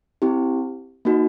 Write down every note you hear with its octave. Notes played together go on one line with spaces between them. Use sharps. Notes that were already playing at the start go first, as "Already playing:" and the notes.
C4 E4 G4
A#3 D#4 F#4